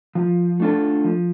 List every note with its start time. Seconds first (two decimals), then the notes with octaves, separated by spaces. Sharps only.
0.15 F3
0.60 A3 D4 F4 A4
1.04 F3